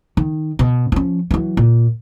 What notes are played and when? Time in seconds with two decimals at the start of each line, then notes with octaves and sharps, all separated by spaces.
0.17 D#3
0.59 B2
0.92 F3 C#4
1.31 E3 F#3
1.57 A#2